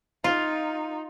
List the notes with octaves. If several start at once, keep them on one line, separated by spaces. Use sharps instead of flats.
D#4 F4